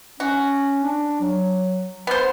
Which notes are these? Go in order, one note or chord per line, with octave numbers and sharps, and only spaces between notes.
C#4 F#4
D4
F#3
B3 C5